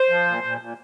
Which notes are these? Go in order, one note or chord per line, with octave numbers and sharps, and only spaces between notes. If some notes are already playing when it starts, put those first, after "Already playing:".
Already playing: C5
F3
A#2
A#2
A#2